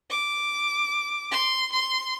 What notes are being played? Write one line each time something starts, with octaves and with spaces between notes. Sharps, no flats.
D6
C6
C6